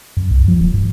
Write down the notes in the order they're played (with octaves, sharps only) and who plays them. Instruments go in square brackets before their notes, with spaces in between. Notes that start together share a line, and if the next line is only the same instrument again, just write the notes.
[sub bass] F#2
C2
F3
D1
G2